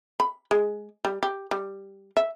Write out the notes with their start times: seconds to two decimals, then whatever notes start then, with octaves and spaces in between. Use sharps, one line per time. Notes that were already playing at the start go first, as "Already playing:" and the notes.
0.20 B5
0.51 G#3
1.05 G3
1.23 G4
1.51 G3
2.17 E5